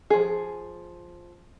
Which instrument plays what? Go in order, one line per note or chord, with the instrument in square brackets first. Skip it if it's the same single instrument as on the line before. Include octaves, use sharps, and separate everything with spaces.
[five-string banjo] F3 G#4